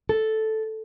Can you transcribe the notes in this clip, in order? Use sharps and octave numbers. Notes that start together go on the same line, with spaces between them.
A4